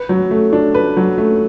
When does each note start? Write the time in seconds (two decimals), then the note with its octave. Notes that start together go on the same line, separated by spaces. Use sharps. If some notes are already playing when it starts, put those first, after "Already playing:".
Already playing: B4
0.09 F#3
0.31 A3
0.53 D4
0.74 B4
0.97 F#3
1.18 A3